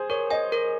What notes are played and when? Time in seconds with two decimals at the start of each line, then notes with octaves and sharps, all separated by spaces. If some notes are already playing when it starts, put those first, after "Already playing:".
Already playing: G#4 C5
0.10 A#4 C#5
0.30 D#5 G#5
0.52 A#4